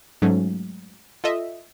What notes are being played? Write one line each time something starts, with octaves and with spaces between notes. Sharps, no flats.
G#2 F#3 A3 C#4
F4 A4 D#5 E5